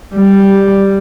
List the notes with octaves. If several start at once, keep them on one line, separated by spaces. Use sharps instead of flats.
G3